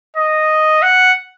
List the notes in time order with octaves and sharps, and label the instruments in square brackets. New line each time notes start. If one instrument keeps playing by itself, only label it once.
[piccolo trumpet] D#5
F#5